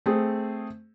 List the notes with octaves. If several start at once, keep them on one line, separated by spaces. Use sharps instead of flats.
A3 C4 G#4